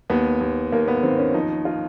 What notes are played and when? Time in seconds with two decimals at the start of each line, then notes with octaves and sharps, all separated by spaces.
0.10 D#2 B3
0.41 D#2
0.72 D#2 A#3
0.88 B3
1.03 D#3 C4
1.18 C#4
1.34 F3 D#4
1.65 F4